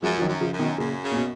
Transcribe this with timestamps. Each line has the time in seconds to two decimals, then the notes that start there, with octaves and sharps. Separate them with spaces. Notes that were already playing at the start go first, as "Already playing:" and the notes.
0.02 F#2 F3 G#3
0.18 F3
0.22 D#3 F#3
0.28 F#2
0.41 C#3 F3
0.53 F#2
0.59 B2 D#3
0.78 F#2 A#2 C#3
1.04 C#3
1.11 A#2
1.16 B2